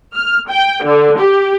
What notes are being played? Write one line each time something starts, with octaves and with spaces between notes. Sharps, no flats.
F6
G5
D3
G4